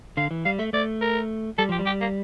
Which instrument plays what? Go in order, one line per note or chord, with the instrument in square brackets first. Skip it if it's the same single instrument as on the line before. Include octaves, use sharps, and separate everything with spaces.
[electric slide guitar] D3 [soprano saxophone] F5
[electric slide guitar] E3
[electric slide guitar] G3 [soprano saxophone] F5
[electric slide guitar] A3 [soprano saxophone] E5
[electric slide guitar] A3 [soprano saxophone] D5
[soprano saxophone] A#4
[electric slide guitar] G3 [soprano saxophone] A4
[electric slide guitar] F3 [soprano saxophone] G4
[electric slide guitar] G3
[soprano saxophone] G4
A#3